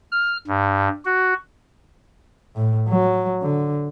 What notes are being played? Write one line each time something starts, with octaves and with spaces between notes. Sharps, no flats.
F6
G2
F#4
A2
F#3
D3